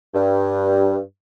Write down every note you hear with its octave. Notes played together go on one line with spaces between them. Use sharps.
G2